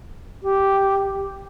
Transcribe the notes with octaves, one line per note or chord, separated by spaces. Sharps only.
G4